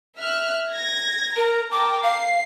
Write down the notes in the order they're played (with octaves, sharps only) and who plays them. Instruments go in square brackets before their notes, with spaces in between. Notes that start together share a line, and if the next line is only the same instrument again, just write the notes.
[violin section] E5 F6 F#6
G#6 A#6
[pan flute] A#4 [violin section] A#5
[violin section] A#4 G5 A5 [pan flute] D6
[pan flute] F5 [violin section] C7